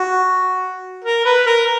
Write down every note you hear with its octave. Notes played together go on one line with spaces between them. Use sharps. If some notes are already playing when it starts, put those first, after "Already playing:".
Already playing: F#4
A#4
B4
A#4